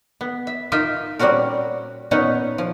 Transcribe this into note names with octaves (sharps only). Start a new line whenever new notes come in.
B3
E5
D#4 F4 A#4 D#5 E5
A#2 G3 C4 C#4 F#4 A#4
A#2 B3 C#4 D#4 F#5 A#5
F3